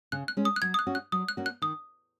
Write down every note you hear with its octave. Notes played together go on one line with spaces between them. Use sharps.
C#3 F#6
F#6
G#3 C#4
D#6
F#6
F#3 G#6
D#6
F#6
C#4 F#4
F#6
F#3 D#6
F#6
A#3 C#4 F#4
F#6
D#3 D#6